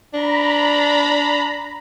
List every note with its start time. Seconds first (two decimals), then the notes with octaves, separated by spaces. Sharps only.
0.14 D4 A#5 B5